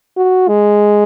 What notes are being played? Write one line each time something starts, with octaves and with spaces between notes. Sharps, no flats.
F#4
G#3